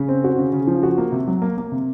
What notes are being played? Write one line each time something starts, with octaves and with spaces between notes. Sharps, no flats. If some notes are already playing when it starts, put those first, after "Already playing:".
Already playing: C#3
C4
F#4
C#3
C#3
F3
F#4
A#3
C3
F#3
A#3
A#3
C3